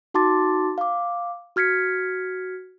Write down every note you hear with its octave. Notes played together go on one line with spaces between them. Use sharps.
D#4 F#4 A5 C6 D6 A6
F5 D6
F#4 F6 G#6 B6 C#7